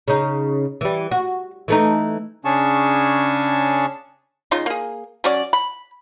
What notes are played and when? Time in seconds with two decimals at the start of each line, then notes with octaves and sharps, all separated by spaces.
0.08 C#3 D#4
0.81 E3 G3
1.11 F#4
1.68 E3 A3 D#4
2.45 C#3 C#4 D4 G#4 A5 C#6
4.51 C#3 D#4 F4 C6
4.66 A#3 G#4
5.24 F#3 C#4 D5
5.53 B5